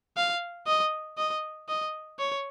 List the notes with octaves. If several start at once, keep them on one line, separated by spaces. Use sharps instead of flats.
F5
D#5
D#5
D#5
C#5